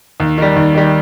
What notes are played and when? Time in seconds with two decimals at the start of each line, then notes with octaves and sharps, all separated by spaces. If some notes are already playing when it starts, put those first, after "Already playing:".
0.20 D#2
0.38 D#3 G3
0.56 D#2
0.75 D#3 G3